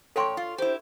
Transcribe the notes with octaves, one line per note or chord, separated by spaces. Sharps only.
A#2 A4 C#5 G5 C6 C#6
F4
E4 G4 C5